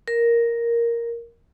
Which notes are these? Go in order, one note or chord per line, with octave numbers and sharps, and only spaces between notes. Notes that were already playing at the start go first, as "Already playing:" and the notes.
A#4